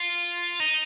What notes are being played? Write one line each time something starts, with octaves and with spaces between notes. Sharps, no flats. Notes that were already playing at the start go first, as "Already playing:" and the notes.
Already playing: F4
D#4